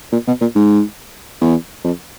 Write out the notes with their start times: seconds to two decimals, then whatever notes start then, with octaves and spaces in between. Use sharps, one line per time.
0.12 A#2
0.27 B2
0.41 A#2
0.55 G#2
1.41 E2
1.85 F2